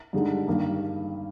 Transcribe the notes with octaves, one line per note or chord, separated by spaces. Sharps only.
G2 D3 G#3 D#4
G2 D#3 A#3